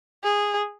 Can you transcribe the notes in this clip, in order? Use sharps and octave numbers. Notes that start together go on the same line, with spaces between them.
G#4